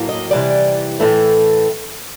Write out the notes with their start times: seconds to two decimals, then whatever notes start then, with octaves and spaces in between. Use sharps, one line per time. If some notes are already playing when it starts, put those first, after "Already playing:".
Already playing: A2 F#3 A#3
0.09 D#5
0.31 C3 E3 G3 D5
1.00 A2 E3 A3